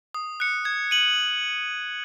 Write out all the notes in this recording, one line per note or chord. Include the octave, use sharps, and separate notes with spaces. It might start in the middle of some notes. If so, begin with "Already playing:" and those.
D#6
F#6 C#7
G#6
D#7 F#7